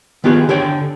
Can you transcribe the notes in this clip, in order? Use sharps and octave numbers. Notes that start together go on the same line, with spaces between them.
D#3 B3 F4 G4 G#4
D3 G4 C#5 G5